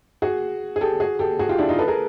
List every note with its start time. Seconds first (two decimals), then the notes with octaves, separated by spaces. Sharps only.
0.22 F#4 G#4
0.76 G#4
0.81 G4 A4
1.00 F#4 G#4
1.19 G4 A4
1.39 F#4 G#4
1.49 F4 G4
1.58 D4 E4
1.69 D#4 F4
1.78 A4 B4
1.88 G#4 A#4